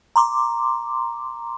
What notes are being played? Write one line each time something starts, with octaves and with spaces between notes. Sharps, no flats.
A#5 C6 D6